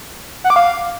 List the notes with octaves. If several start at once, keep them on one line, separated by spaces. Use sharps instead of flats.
F#5
D6
F5